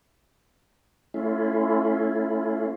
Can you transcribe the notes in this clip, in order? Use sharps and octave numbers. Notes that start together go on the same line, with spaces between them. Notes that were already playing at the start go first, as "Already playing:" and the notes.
A3 C#4 E4 F4